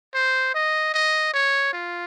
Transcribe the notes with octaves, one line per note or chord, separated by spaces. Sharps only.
C5
D#5
D#5
C#5
F4